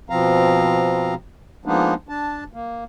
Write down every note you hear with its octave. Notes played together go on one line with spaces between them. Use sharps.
B2 F3 C4 F5 A#5
F3 G#3 A#3 B3 D4 D#4
D4 A5
A#3